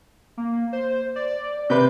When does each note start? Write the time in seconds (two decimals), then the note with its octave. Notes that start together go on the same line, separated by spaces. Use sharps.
0.37 A#3
0.73 C5
1.16 D5
1.70 C3 B4 G6